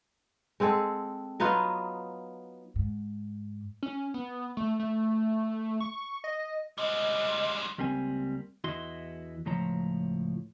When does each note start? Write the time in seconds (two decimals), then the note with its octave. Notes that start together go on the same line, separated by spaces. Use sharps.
0.60 G#3 C4 G#4 A4
1.40 F#3 B3 D#4 F4
2.76 G#2
3.83 C#4
4.14 B3
4.57 A3
4.79 A3
5.81 C#6
6.24 D#5
6.78 G3 G#3 D#5
7.78 C#2 G3 A#3 C4 G#5
8.64 E2 E4 F#4 D#5 C6
9.46 C#2 A2 F3 C#5 A#5